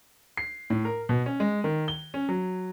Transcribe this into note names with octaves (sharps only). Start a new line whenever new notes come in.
C7
A2
A#4
B2
C#4
G#3
D#3
G7
C#4
F#3